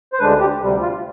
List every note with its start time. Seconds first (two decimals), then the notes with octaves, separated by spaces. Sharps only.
0.13 C5
0.19 D2 D3 G#3 D4 B4
0.40 G4
0.60 D2 C3 G3
0.82 F4